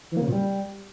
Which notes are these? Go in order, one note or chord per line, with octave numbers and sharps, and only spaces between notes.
E3
A#3
C#3
A#2
G3